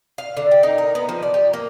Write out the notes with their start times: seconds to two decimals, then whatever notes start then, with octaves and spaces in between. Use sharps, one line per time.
0.18 F5
0.37 D3
0.51 G5
0.63 D#4
0.78 A#4
0.95 B3
1.09 F3
1.23 D5
1.34 G4
1.53 A#3